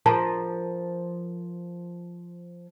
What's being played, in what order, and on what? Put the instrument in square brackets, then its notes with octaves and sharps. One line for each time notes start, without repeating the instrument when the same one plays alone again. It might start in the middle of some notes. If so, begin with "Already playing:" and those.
[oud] F3 A#4 C5 [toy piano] G#4 A5